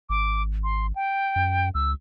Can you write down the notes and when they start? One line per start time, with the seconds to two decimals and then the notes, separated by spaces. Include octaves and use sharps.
0.10 G#1 D6
0.64 C6
0.95 G5
1.36 F#2
1.75 C#2 E6